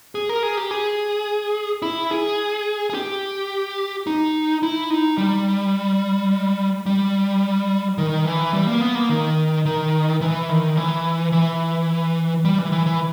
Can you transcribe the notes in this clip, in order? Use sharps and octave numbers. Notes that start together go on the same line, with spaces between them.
G#4
A#4
G#4
G4
G#4
E4
G#4
G#4
G4
D#4
E4
D#4
G3
G3
D#3
E3
G3
A#3
B3
A#3
D#3
D#3
E3
D#3
E3
E3
G3
E3
E3
E3